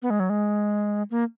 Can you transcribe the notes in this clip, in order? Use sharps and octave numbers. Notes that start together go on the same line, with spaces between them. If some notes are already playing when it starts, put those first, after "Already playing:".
B3
G#3
F#3
G#3
A#3